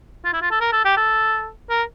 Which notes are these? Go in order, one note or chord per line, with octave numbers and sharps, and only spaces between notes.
F4
E4
F4
A4
A#4
A4
G4
A4
A#4